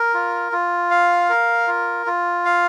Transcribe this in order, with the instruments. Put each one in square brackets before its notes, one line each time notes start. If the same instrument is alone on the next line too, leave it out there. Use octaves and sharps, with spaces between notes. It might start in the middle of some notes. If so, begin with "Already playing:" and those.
Already playing: [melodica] A#4
F4
F4
F5
A#4
F4
F4
F5